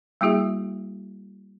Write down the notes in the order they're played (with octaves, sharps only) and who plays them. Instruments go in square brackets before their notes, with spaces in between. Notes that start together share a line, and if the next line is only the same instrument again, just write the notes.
[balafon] G3 A#3 E4 F#4 G#4 E5